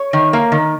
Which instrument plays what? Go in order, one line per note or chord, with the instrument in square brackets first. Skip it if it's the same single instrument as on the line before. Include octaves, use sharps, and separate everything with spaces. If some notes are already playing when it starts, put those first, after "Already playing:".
Already playing: [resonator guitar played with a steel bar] C#5
D#3
A#3
D#3